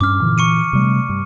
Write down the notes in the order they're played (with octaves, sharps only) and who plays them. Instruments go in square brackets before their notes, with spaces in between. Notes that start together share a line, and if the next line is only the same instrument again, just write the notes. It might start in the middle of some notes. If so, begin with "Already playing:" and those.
[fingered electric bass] G2 C#4 [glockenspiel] D6 F6
[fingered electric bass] A#2 D3 E3
[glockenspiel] C#6 C#7 D#7
[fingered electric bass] C3 G3 A3
G2